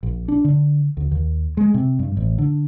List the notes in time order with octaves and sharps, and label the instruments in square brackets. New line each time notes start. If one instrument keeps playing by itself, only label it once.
[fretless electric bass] A#1
D4
D3
D2
D#2
G#3
C3
G2
A1
D3